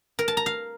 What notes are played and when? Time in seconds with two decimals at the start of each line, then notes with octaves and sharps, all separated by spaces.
0.19 A#4
0.28 A5
0.37 A#5
0.46 F5